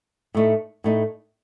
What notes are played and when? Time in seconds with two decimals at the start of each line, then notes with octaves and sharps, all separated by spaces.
0.35 A2 A3 D#4
0.84 A2 A3 D#4